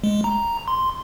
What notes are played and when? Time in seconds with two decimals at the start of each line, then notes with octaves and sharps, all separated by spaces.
0.04 G#3
0.24 A#5
0.68 C6